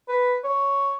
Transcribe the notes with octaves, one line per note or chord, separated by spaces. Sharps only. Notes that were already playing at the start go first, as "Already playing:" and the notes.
B4
C#5